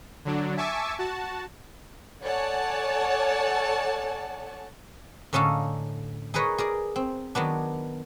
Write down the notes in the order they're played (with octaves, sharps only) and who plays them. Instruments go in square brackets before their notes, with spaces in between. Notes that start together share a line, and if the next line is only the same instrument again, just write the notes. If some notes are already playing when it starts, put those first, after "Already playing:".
[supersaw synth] D3 F#3 D4
E5 G#5 A5 C#6 D6 E6
F#4 A5
[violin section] A4 C#5 D5 F#5 G#5 A5
[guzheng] A2 D3 C#4 D#4 A4 F5
D#4 G#4 A#4 B4 C#5 D#5
G#4 A#4 D5
C4
D#3 F#3 B3 D4